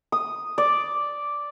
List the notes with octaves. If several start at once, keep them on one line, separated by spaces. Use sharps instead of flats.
D#6
D5